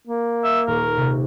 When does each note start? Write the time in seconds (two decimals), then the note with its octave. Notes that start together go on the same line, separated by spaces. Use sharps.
0.07 A#3
0.44 E5
0.67 D#1 A#4 C#6
0.97 C3